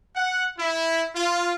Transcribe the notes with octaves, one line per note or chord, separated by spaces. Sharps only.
F#5
E4
F4